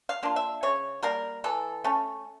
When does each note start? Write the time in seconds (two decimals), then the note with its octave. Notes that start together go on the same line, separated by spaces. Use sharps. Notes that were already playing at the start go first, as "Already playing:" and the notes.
0.09 F5
0.23 A#3 D4 F4
0.36 E5
0.63 C#3 C#5
1.03 G3 A#3 A#4
1.44 E3 A4
1.84 A3 C#4